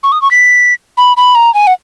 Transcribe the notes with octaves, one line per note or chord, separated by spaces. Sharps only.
C#6
D#6
C#6
B6
B5
B5
A#5
G#5
F#5